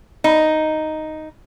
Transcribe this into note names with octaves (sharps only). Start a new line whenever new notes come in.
D#4